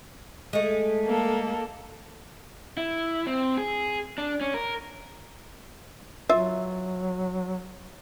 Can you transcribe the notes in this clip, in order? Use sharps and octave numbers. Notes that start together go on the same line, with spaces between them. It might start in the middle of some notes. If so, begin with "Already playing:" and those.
G#3 A3
A#3 A4
E4
C4
G#4
D4
C#4
A#4
F#3 F4 E5